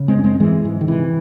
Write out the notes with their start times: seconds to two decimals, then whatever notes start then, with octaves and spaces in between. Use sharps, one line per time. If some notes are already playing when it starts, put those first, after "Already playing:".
Already playing: C#3
0.08 G#3 C4
0.16 F#2 C#4
0.24 G#3 C4
0.40 G#2 E3 G#3
0.64 G#2 E3
0.81 D#3
0.88 C3 E3